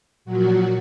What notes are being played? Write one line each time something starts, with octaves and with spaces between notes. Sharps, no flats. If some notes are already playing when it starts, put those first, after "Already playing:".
A#2 F3 F#3 F#4